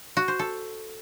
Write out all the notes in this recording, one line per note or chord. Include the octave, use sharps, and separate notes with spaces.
F#4
C5
A4